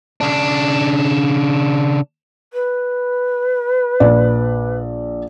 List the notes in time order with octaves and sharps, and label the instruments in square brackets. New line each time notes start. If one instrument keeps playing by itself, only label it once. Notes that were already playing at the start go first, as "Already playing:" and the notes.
[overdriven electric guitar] C#3 D4
[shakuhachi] B4
[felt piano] A#1 D5